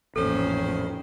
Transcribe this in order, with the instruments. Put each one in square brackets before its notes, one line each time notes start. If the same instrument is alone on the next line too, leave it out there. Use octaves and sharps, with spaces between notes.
[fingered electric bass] A1 F2 [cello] A#2 C#4 [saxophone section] D#3 C5 [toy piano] A4